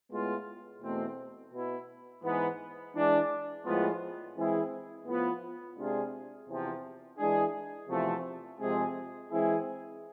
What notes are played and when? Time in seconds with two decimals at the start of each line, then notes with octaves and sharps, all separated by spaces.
0.11 A2 G#3 B3 F4
0.82 E2 B2 A3 C4
1.52 B2 B3 E4
2.23 G#2 E3 B3
2.94 E3 G#3 D4
3.65 A2 F3 G#3 B3 F4
4.36 E3 G#3 C4 E4 G#4
5.06 A2 F3 B3 F4
5.77 C3 G#3 D4 F4 G#4
6.47 E2 C3 F3
7.18 E3 G#3 D4 G#4
7.89 E2 C3 F3 A3
8.60 F2 C3 G#3 C4 G#4
9.30 E3 G#3 C4 E4 G#4